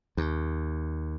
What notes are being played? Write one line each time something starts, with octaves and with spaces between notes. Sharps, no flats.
D#2